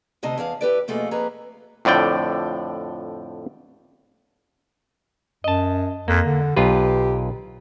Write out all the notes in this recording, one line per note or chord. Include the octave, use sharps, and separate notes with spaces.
D2 C3 D#4 D#5 A5
E2 G#4 F5 A5
E4 G4 B4 D5
F2 B2 A3 A#3 F4 G#4
F2 A#3 G#4 B4 A#5
F2 A2 D3 D5 G5
F#2 D#5 A5
F2 A#3
D3
B1 F4 G4 B4